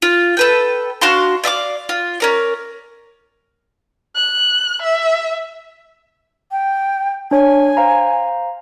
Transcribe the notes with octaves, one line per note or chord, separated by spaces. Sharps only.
F4
A4 B4 G5
D4 F#4 F5 C6
D5 E5 F5 D6
F4
C#4 A#4 D5
F#6
E5
G5
D4 C#5 G#5
C5 F5 A#5